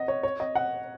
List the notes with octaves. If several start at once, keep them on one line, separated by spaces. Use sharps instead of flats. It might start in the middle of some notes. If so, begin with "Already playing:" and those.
Already playing: D#5 F#5
C#5
C#5
D#5
F#5